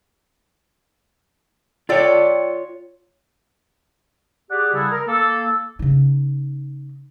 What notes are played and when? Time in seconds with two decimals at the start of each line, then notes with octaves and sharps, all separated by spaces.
1.89 F4 A4 C#5 D5 G5
4.51 G4 G#4 D5 F#5
4.73 C#3 G3 E4 G#4 A4
4.91 A#4
5.07 A#3 A4
5.79 C#3 D#4